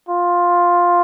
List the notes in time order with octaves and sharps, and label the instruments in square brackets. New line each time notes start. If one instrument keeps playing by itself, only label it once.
[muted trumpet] F4